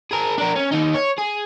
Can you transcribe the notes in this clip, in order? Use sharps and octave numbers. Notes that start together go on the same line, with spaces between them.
G#4 A#4
D4 A#4
C#4
D#2 D#4
C#5
G#4